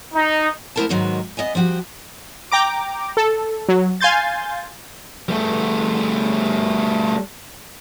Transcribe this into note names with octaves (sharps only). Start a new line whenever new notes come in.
D#4
A3 B3 E4 A#4 C5 A5
G#2 D#3 F#3 G#3 B3 F#4
B3 D#5 E5 G#5
F3 G3 F#4 G4
G5 A#5 D6
A4
F#3
F5 G#5 C6 G6 A6
G3 A3